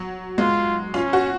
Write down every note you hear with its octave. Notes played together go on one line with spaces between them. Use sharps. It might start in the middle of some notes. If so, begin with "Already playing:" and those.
Already playing: F#3
G#3 F4
C#4 F4
F#4